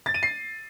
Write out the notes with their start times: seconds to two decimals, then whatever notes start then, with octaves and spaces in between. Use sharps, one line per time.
0.06 A6
0.14 D#7
0.23 C7